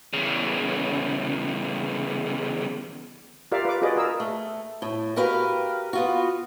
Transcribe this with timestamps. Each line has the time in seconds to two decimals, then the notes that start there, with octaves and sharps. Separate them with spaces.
0.13 E2 C#3
3.52 F4 G4 A#4 D5 E5 F5
3.65 B4 D6
3.82 F4 F#4 G#4 B4 D5 D#5
3.96 G#4 A#4 E6
4.20 A3
4.82 A2
5.16 F#4 G4 A#4 B4 F5
5.93 B3 F4 F#4